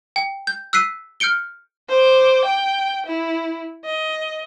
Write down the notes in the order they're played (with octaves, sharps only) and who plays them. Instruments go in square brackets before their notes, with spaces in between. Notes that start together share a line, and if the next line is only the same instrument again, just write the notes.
[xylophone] G5
G6
E6 F#6 B6 C7 D#7
F6 G6 C#7 D7 G7
[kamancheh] C5 D6
G5
E4
D#5